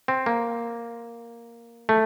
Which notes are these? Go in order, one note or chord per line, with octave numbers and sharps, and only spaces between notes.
C4
A#3
A3